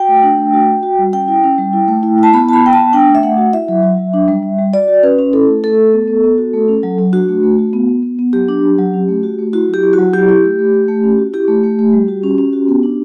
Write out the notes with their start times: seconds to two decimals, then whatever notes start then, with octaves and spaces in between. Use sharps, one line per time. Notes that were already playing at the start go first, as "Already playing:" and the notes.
Already playing: F#4 G5
0.08 A3
0.23 D4
0.38 A3
0.53 F#4
0.68 F#4
0.83 F#4
0.98 G3
1.13 C#4 G5
1.28 E4
1.44 C#4
1.58 G3
1.73 E4
1.88 A3
2.03 E4
2.18 E4
2.23 A5
2.33 B3 B5
2.48 B3 A5
2.53 B5
2.63 B3 G5
2.73 A5
2.78 B3
2.93 D4 G5
3.08 A3
3.15 E5
3.23 A3 F#5
3.38 F#4
3.53 E4 E5
3.68 F#3
3.83 F#3
3.98 F#3
4.14 D4
4.28 G3
4.43 G3
4.59 G3
4.73 F#4 D5
4.88 F#4
5.03 C#4 B4
5.18 C#4
5.33 E4 A4
5.48 A3
5.63 A3 A4
5.78 A3
5.93 B3
6.08 B3
6.23 B3
6.38 F#4
6.54 A3
6.68 C#4
6.83 F#3
6.99 F#3
7.13 D4 F#4
7.28 A3
7.43 A3
7.58 F#4
7.73 B3
7.88 B3
8.03 B3
8.19 B3
8.33 F#3 G4
8.49 D4
8.63 F#3
8.78 F#3
8.93 C#4
9.09 A3
9.23 F#4
9.39 A3
9.53 E4 F#4
9.68 F#3
9.74 G4
9.83 E4
9.93 F#4
9.98 F#3
10.13 E4 G4
10.29 E4
10.44 A3
10.59 A3
10.73 A3
10.88 A3
11.04 C#4
11.18 F#4
11.33 E4 G4
11.48 A3
11.63 A3
11.79 A3
11.93 G3
12.08 F#4
12.24 C#4
12.38 C#4
12.53 F#4
12.68 B3
12.83 D4